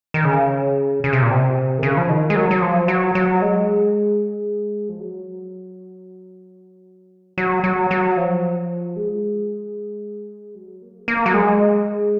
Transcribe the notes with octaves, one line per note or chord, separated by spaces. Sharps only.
D#3
C#3
C#3
C3
A#2
C3
D#3
C#3
F3
D#3
G#3
F#3
F#3
F3
F#3
F#3
G#3
F3
F#3
F#3
F#3
F#3
F3
G#3
F#3
A#3
G#3
A#3
F#3
G#3